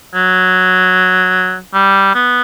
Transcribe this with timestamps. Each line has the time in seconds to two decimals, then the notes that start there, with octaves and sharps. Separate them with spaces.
0.15 F#3
1.74 G3
2.15 B3